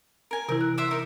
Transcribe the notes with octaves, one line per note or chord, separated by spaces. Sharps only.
A#4 G#5
C3 E3 E4 A#4
F#6
C5 E5 D6
D#4 A#4